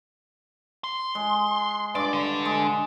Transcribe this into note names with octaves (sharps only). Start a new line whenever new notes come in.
C6
G#3
G2 D5 D6
D3
G#3